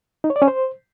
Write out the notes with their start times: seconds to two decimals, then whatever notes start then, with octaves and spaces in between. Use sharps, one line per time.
0.24 D#4
0.30 C#5
0.36 D5
0.42 C#4
0.48 C5